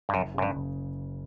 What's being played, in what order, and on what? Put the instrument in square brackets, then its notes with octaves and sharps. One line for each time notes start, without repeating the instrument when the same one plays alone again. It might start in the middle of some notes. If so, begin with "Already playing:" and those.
[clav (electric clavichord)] G2
[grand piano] F#1 [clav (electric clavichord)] F#2
[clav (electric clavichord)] F#2 [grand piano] C#3
[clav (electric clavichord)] G2
[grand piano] F#1